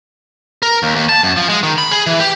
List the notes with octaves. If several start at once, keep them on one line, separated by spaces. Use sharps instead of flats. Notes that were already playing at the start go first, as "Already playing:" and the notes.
A#4
D#2
D#2
A5
F#2
F3
G#3
D#3
B5
G#4
E3
G4